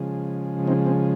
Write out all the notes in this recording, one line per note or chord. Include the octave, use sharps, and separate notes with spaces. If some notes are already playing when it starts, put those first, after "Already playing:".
Already playing: C#3 F3 G#3
C4 D#4
C4